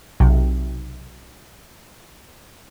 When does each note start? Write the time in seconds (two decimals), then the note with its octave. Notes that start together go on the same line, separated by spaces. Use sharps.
0.20 B1 C3